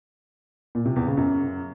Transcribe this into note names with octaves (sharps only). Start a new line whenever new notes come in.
A#2
C3
E2
C#3
F#2